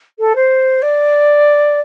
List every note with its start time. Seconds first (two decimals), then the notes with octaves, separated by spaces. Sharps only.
0.19 A4
0.35 C5
0.82 D5